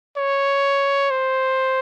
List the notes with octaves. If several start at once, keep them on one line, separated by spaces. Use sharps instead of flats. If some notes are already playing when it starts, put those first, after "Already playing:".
C#5
C5